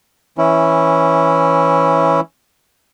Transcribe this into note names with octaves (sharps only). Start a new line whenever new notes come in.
E3 C#4 E4